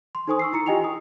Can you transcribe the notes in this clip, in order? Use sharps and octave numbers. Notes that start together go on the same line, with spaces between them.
C6
D#4 A4 C5 G#5 C#6 D#6
C#6 E6 C7
E4 A#5 C#7
F4 G4 D#5 G5 G#5 F7
D#6